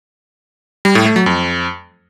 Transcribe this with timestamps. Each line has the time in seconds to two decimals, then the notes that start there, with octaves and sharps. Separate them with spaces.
0.85 G3
0.95 A2
1.06 A3
1.16 F#3
1.26 F2